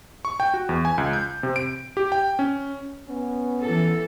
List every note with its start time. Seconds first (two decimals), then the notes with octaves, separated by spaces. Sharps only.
0.25 C#6
0.40 G5
0.54 F#4
0.69 E2
0.85 G#5
0.98 C#2
1.13 G6
1.43 C3
1.56 D7
1.97 G4
2.12 G5
2.39 C#4
3.08 B3 C#4
3.61 E3 A4